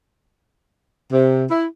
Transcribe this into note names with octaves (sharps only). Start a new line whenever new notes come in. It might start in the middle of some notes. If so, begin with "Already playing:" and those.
C3
E4